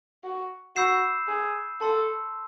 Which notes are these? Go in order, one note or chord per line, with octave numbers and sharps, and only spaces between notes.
F#4
F#4 B5 E6 G6 C7 E7
G#4
A4 A5 C6 E6